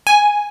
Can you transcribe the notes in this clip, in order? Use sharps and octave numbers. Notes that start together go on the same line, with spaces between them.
G#5